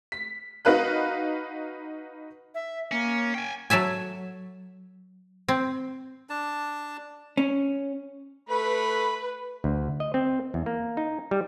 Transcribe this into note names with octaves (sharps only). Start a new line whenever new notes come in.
B6
D#4 F#4 B4 F5 F#6
E5
A#3 C#4
G5 G#5
F#3 A4 E5 G#5
C4
D4 A5
C#4
A3 B4 B5
D2
D#5
C4
E2
A#3
D#4
G3